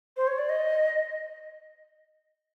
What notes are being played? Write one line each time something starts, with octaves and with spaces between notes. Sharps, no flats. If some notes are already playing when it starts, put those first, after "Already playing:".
C5
C#5
D5
D#5